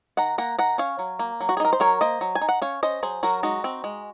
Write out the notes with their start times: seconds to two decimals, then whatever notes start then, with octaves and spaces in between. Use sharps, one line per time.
0.17 D#3 F#5 A#5
0.38 A#3 F#5 A#5
0.59 D#3 F#5 A#5
0.78 C#4 C#5 F5
0.99 F#3
1.19 A#3
1.40 F#3
1.49 F#4
1.57 G#4
1.60 D#4 A#4
1.73 C5
1.80 F#3 A#4 C#5
2.01 A#3 C5 D#5
2.21 F#3
2.35 G#5
2.41 D#4
2.49 F#5
2.62 C#4 C#5 F5
2.83 C#4 C5 D#5
3.02 F#3 G#4 C5
3.23 F#3 F#4 A#4
3.43 G#3 D#4 F#4
3.64 C4
3.84 G#3